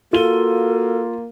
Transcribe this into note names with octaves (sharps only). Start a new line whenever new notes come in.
A#3 F4 F#4 A4 D#7 G7